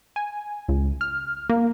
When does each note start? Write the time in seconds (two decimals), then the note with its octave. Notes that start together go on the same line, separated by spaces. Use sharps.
0.16 G#5
0.68 C#2
1.01 F6
1.49 A#3